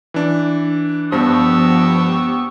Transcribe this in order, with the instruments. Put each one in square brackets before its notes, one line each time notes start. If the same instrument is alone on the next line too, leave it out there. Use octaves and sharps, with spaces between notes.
[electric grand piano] E3 D4
[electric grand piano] G2 [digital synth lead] F3 [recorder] B3 [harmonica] G4 C#6 E6